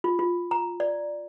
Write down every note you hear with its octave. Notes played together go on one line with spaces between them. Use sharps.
F4
F4
A#5
D5